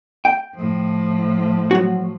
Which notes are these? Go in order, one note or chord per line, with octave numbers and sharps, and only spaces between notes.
G5
A2 F3
F#3 F#4